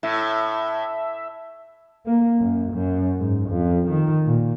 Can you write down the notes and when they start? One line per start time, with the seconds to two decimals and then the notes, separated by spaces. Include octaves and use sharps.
0.03 A2 E5
2.06 A#3
2.39 F#2
2.72 F#2
3.20 G#2
3.50 F2
3.90 D#3
4.25 A#2